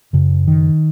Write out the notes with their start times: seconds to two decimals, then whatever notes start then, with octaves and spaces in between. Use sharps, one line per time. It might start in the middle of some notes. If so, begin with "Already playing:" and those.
0.13 F#2 C#3
0.48 D#3